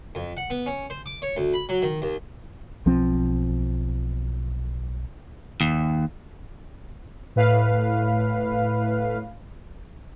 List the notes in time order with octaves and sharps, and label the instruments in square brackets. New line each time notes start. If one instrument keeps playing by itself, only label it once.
[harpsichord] F2
F#5
B3
C#4
C5
D6
C#5
D2
B5
F#3
D#3
D#2
[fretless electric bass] B1 F3 C4
[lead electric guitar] D#2
[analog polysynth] A2 B4 F5